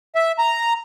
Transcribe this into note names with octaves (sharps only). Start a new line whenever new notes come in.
E5
A#5